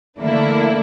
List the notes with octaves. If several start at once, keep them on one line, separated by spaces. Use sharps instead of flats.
D3 A3 A#3 D4 E4